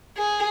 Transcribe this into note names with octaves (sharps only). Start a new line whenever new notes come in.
G#4